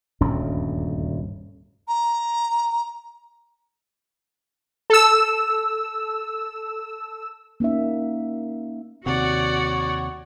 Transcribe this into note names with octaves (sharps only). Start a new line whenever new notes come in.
D#1 D2 G2 C#4
A#5
A4 E6
A#3 C#4 D#4 E5
D#2 C3 F#4 C#5 D5 F#5